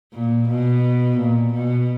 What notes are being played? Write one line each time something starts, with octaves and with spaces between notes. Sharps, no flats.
A#2
B2
A#2
B2